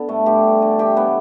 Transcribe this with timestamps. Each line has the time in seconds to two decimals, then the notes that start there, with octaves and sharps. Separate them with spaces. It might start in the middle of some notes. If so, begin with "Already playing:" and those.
Already playing: D3 B3
0.08 G2 A3
0.26 G2 G4
0.44 G2
0.62 D3
0.79 E3 G4
0.96 A2 B3